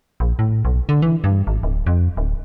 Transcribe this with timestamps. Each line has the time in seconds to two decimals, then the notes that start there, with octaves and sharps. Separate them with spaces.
0.20 A#1
0.39 A2
0.65 B1
0.89 D3
1.02 E3
1.24 G2
1.47 G#1
1.63 D1
1.86 F2
2.17 D1